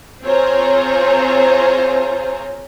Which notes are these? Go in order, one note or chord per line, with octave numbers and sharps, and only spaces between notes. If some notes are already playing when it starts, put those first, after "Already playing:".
C4 F4 G#4 C5 C#5 A#5